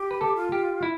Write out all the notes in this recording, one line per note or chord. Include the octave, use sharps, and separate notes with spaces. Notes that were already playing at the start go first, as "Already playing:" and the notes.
Already playing: G4
B4
A4
F4
G4
E4